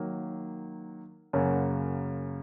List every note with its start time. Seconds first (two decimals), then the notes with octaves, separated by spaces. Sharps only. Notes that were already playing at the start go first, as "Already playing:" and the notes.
Already playing: D#3 F#3 A#3
1.33 F#2 C#3 A#3 F#4